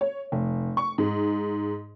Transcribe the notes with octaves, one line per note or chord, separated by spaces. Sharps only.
C#5
F1
C#6
G#2